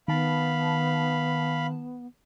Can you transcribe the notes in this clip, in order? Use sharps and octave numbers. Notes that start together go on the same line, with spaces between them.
D#3 B3 F5 A5 B5